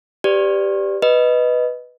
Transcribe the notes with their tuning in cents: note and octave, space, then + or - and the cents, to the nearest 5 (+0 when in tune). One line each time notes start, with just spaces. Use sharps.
G4 +0 B4 +40 D5 +0
B4 +0 D#5 +0